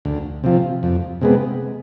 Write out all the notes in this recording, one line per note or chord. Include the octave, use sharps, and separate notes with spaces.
D2
C3 F3
F2
C3 G#3 B3